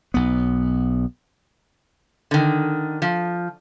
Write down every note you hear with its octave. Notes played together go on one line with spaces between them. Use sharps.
B1 B3
D3 D#3
F3